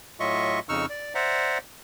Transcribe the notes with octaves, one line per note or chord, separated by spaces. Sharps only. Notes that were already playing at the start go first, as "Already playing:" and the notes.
A2 F#3 F4 D#5 E5 C#6
F2 C#3 D#4 C#6 E6 F6
D5
C5 D5 E5 F#5 A#5